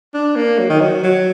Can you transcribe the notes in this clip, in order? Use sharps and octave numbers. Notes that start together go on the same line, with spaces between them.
D4
A#3
F#3
D#3
F#3
F#3